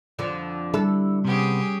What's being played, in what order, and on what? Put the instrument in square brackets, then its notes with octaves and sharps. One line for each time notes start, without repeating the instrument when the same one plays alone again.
[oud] F2 D3 F3
[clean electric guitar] D3 E4 [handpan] G3 [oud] A4
[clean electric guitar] C3 B3 [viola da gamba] C#4 G4 G#4